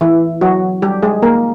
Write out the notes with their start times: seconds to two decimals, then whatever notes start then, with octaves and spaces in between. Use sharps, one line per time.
0.01 E3 E4
0.41 F#3 F#4
0.82 G3 G4
1.03 G#3 G#4
1.22 A#3 A#4